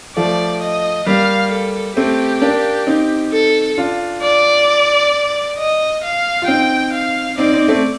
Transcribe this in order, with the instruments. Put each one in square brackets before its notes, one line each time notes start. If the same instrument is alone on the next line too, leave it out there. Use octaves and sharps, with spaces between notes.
[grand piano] F3 A3 [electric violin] D5
[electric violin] D#5
[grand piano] G3 A#3 [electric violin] F5
[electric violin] A4
[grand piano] A3 C4 [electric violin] G4
[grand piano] A#3 D4
C4 D#4
[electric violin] A4
[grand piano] D4 F4
[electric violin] D5
D#5
F5
[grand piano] F4
[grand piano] C4 D#4 [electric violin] G5
[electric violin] F5
[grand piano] C4 D#4 [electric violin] D5
[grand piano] C4 D#4
A3 C4